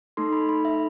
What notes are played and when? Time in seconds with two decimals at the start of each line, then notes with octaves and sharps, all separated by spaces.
0.17 A3 D#4 A4 C6
0.32 B5
0.49 B5
0.65 E5